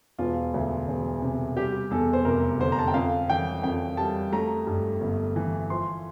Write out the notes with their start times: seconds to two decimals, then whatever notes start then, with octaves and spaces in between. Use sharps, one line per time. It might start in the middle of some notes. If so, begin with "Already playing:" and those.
0.18 E1 F4
0.54 D2
0.88 E1
1.22 C3
1.57 G3 G4
1.91 E2 A4
2.13 C5
2.25 F1 A#4
2.59 D3 C5
2.72 A#5
2.79 A5
2.88 G5
2.94 F2 F5
3.30 E3 G5
3.63 F2 G5
3.97 G3 A5
4.32 A3 A#5
4.67 G2
5.01 G1
5.36 E3
5.70 F3 C6